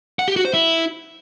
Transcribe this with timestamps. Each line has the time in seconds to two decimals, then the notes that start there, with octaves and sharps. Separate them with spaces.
0.19 F#5
0.28 G4
0.36 F#4
0.45 C5
0.53 E4